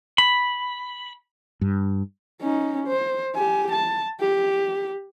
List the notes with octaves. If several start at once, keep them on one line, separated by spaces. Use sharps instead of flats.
B5
G2
C#4 D#4
C5
G4 G#5
A5
G4